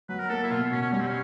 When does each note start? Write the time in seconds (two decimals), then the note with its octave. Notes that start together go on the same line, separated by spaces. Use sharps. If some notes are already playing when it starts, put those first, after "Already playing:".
0.09 F#3 B4
0.20 A#4
0.30 A#3 A4
0.44 E4
0.51 B2 F4
0.71 B2 C#4
0.82 C#4
0.92 G3 C#4
1.00 C4
1.07 C#4